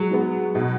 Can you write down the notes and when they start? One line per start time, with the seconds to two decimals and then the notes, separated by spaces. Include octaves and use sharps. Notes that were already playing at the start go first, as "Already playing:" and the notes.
Already playing: F#3 G#3
0.11 G#3 B3
0.55 B2